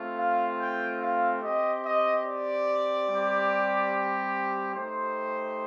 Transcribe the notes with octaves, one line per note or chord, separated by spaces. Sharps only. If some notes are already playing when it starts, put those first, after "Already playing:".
Already playing: A3 C4 F4
F5
G5
F5
C4 G4 D#5
D#5
D5
G3 C4 G4
A3 D#4 G4 C5